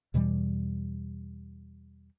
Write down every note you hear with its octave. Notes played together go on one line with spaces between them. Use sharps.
E2 B2 E3 G3